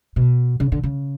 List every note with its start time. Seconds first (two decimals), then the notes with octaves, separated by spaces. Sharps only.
0.16 B2
0.60 C#3
0.72 D3
0.83 C#3